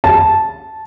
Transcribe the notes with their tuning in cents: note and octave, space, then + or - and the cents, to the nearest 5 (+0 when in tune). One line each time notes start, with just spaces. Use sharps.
A5 -10